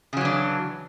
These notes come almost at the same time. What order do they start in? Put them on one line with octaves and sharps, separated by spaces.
C#3 F#3 E3 D4